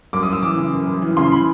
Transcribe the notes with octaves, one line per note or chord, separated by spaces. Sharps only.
F#2 D6
D#6
F#2 E6
E3 D6
C#3
F#2
F#2
E3
C#3 C6
E3 B5